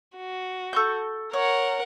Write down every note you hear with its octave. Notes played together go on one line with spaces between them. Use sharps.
F#4
A4 C#6 G6
A#4 C#5 F#5